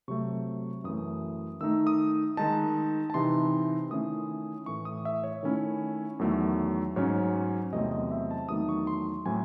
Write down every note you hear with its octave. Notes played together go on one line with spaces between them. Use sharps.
C3 F#3 A3 C#6
F#2 E3 A3 D#6
D#3 A3 D#4 E6
D#6
D#3 G#3 D#4 A5
A5
C3 E3 C4 D#4 C6
D#3 A3 C#4 E4 D#6
A2 E3 A3 C#6
D#6
E5
C#5
D#3 A3 C#4 E4
E2 D#3 F#3 A3
G#2 F#3 C#4 C#5
E2 C3 F#3 A3 C4 D#5
D#5
E5
A5
E2 D#3 F#3 A3 D#4 D#6
C#6
C6
A2 F#3 C4 E4 G#5